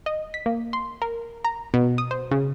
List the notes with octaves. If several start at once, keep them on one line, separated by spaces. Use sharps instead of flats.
D#5
B6
A#3
C6
A#4
A#5
B2
D#6
C5
C#3